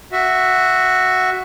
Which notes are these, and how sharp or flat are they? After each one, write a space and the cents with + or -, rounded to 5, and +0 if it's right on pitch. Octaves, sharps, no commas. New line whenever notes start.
F#4 +0 E5 +0